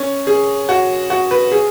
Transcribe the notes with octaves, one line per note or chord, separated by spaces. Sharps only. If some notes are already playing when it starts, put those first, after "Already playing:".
Already playing: C#4
G#4
F#4
F#4
B4
G#4